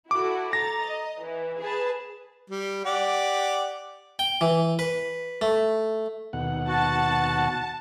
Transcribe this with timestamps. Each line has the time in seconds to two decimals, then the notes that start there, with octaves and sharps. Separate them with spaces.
0.11 E4 F#4 A4 D6
0.53 A4 A#5 A6 A#6
0.86 D#5
1.24 E3
1.62 G#4 B4 A5
2.50 G3
2.85 G4 D5 F#5
4.19 G5
4.41 E3
4.79 B4
5.41 A3
6.33 D#2 B2 F#5
6.68 F#4 A5